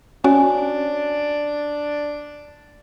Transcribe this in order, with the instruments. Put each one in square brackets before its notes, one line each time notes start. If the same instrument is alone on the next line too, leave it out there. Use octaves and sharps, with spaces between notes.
[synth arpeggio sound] C#4 F#4 [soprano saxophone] D4 [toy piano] C#5 G#5